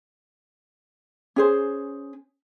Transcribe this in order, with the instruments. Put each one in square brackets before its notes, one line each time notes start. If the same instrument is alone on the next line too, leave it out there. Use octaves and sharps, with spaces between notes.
[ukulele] C#4 G#4 C5